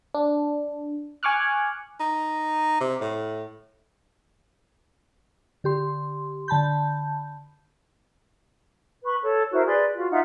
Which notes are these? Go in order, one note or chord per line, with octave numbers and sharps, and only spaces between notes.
D4
G#5 C#6 D6 F6 F#6
D#4
C3
A2
D3 G4 C6
D3 A5 B5 G6
B4 B5 C#6
A4 C#5
E4 F#4 A#4 C5
G#4 B4 D5 C6
F4 F#4
D#4 F4 E5 F#5